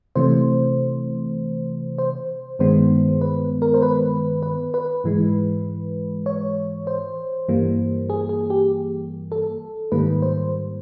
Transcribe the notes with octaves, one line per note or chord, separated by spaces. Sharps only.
C3 E3 A3 C5
C5
G2 D#3 G#3 B3 C5
B4
A#4
C5
B4
B4
B4
G#2 E3 G#3
C#5
C5
G2 E3 G3 A#3
G#4
G#4
G4
A4
G#2 D#3 G3 A#3 B4
C5